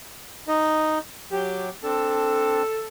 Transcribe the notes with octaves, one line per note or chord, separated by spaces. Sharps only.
D#4 D#5
F#3 G4
C4 D4 A4